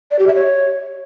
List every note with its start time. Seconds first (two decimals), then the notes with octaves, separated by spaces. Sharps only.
0.11 D5
0.19 G4
0.27 E5
0.35 C#5